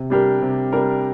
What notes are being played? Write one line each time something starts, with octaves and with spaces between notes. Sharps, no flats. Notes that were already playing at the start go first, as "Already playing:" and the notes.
Already playing: C3
G3 D4 G4 A#4
C3
G3 D4 G4 A#4